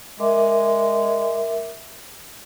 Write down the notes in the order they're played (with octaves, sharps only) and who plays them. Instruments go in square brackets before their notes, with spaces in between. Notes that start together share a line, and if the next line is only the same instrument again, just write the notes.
[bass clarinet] G#3 [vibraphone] A#4 E5 D6